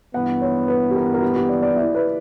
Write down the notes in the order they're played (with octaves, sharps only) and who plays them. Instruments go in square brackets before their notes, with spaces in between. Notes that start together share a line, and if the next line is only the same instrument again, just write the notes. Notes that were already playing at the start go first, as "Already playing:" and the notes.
[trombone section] G2 E3 B3 [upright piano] F#5
[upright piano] C#5
B4
G4
A#4
A#4
G4
G4
D5
D5
E4
B4